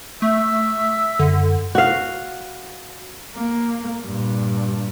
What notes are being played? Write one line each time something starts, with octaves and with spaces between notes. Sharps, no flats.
A3 E5
F#2 D3
F#4 F5
A#3
G2 A#2